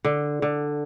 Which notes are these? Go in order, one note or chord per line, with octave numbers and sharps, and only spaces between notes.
D3
D3